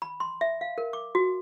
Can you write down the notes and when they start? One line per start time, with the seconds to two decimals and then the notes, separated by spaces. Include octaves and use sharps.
0.02 B5
0.20 C6
0.41 E5
0.61 F5
0.78 A#4
0.93 D6
1.15 F#4